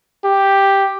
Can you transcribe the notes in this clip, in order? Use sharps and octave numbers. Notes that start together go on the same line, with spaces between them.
G4